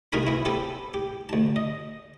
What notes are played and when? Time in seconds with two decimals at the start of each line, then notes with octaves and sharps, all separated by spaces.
0.12 C2 D#4 F#4 A#4 G#5 B5
0.27 B3 E4
0.45 B3 C4 G4 A4 B4
0.94 G4
1.29 D2 A5
1.56 D#5